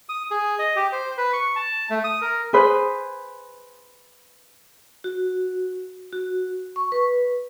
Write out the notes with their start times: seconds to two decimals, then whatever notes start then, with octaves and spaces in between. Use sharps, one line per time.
0.09 D#6
0.31 G#4
0.59 D#5
0.76 G4
0.92 C5
1.18 B4
1.33 C#6
1.56 A5
1.90 A3
2.04 D#6
2.21 A#4
2.53 G#4 B4 C5
5.04 F#4
6.13 F#4
6.76 C#6
6.92 B4